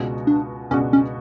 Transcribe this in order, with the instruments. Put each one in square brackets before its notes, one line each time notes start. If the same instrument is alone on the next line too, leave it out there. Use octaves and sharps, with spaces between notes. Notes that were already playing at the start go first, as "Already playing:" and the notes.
Already playing: [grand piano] C#2 B2 G#3 D4 F#4
[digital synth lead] D4
[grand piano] C#2 B2 G#3 D4 F#4 [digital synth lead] C#4
[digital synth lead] C#4